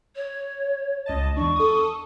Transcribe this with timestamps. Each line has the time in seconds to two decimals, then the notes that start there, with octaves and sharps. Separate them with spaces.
0.16 C#5
1.06 C#2 D#5 A5
1.37 E2 D4 C#6
1.56 A4 D#6